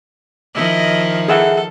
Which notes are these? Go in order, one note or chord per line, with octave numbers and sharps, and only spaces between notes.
D#3 F3 E4 D#5
G#4 A4 E5 F#5